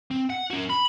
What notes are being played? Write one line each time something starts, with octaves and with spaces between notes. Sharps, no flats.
C4
F#5
C#4 F#4
B5